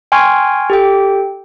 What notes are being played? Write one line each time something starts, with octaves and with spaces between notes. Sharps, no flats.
G5 G#5 C6 C#6 F6 G#6
G4 A4 G5